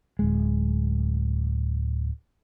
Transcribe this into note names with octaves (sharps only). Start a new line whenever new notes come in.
D1 G#3